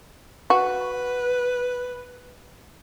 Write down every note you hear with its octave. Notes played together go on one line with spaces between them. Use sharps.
F#4 B4